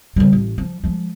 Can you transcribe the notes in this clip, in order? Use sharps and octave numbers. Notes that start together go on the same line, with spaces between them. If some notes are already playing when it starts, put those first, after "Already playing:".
D3 G3
A1
F3
F3 G#3